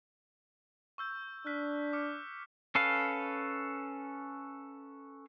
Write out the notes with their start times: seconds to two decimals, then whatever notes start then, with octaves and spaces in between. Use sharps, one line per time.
0.98 C#6 E6 G6
1.46 D4 F6 F#6 B6
1.93 D6 F6 C#7
2.75 C#4 A4 B4 F5